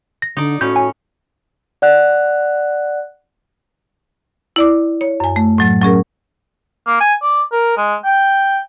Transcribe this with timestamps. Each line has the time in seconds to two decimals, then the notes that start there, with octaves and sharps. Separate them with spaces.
0.22 A#6
0.37 D3 D#4 D5
0.61 A2 C#4 F#4 G6
0.76 G#5
1.82 D5 F#5 F#6
4.56 E4 D5 D6
5.01 C#5
5.20 F#2 G#5
5.36 A3
5.58 A2 F#3 A6
5.82 F#3 C#4 G#4 A#4
6.87 A#3
7.00 G#5
7.22 D5
7.52 A#4
7.77 G#3
8.05 G5